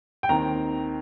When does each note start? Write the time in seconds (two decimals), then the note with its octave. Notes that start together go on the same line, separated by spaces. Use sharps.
0.23 G5
0.29 D#2 D#3 C4 A#5